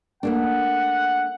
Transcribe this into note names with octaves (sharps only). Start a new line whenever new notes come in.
A3 A#3 D4 F#5